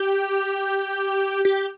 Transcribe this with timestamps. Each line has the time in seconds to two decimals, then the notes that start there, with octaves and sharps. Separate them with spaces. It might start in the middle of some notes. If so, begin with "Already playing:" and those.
Already playing: G4
1.45 G4